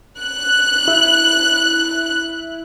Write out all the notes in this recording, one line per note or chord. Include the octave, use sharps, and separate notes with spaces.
F#6
E4